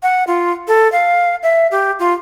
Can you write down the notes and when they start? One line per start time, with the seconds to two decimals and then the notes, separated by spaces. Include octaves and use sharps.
0.03 F#5
0.27 F4
0.68 A4
0.92 F5
1.43 E5
1.71 G4
1.99 F4